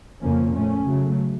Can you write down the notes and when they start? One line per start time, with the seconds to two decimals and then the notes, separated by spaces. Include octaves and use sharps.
0.21 F2 C#3 F3 A#3 C#4
0.55 A#2 A3 C#4
0.86 C#3 F#3 A3